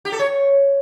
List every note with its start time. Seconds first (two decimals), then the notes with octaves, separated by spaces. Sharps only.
0.05 G4
0.12 A4
0.19 C#5